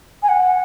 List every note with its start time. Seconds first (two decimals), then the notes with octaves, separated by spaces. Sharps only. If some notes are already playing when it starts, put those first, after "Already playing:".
0.22 G#5
0.28 F#5